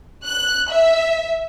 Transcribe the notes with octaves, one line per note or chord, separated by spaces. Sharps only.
F#6
E5